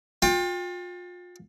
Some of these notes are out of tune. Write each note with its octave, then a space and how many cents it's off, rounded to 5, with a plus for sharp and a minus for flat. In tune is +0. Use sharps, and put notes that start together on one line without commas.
F4 +35 G5 +25